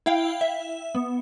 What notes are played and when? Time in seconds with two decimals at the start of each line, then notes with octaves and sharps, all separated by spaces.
0.06 E4 F5 G5
0.41 E5
0.95 B3